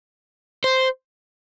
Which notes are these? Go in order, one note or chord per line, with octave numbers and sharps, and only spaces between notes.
C5